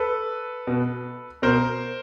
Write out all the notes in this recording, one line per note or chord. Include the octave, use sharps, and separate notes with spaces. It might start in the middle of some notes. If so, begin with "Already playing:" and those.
Already playing: A4 B4
B2
B2 A#4 C5